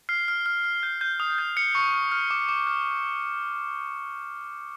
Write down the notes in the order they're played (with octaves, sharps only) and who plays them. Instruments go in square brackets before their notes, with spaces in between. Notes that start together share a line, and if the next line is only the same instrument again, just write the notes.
[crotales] F6 C7
F6
F6
F6
G6
G6
D#6
G6
F6 C#7
C#6
F6
F6
D6
D6
F6